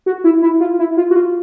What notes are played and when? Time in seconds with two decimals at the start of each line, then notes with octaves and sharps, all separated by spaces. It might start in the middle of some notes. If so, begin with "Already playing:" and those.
0.06 F#4
0.24 E4
0.42 E4
0.60 F4
0.79 E4
0.97 F4
1.11 F#4
1.16 F4